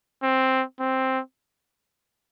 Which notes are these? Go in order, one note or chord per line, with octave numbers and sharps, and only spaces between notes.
C4
C4